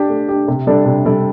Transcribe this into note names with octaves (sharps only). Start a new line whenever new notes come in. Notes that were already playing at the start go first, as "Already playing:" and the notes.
Already playing: D4 G4
A3
D4 G4
C3
G3 D4 A4 D5
C3
G3 D4 A4 D5